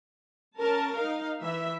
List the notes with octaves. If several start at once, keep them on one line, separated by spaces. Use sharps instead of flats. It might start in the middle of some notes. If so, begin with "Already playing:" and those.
C#4 A#4 A5
D#4 F5
E3 E5